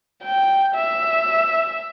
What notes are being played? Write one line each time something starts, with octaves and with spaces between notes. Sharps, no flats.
G5
E5